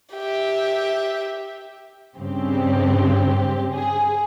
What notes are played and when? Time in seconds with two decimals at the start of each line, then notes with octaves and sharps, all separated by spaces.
0.14 G4 E5
2.18 G2 C#3 C4 G4
3.71 G#4